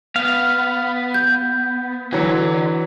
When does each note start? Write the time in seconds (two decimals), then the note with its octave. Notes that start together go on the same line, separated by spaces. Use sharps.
0.16 B3 F5
1.14 G6
2.13 D3 E3 F#3